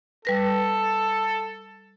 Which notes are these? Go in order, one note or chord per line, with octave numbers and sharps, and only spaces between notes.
G3 A4 B4 A#6